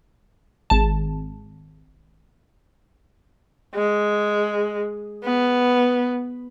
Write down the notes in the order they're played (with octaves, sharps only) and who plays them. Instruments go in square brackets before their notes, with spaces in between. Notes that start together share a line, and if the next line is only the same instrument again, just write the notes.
[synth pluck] G#1 A5
[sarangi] G#3
B3